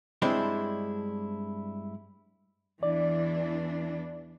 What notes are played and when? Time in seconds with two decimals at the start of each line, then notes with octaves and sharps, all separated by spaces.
0.22 G2 G#3 C4 D4 E4
2.83 E2 E3 D4 D5